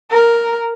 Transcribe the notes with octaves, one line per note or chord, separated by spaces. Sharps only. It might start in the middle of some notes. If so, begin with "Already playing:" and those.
A#4